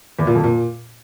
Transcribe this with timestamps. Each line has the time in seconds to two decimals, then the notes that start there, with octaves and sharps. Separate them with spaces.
0.19 E2
0.27 A#2
0.35 F2
0.44 A#2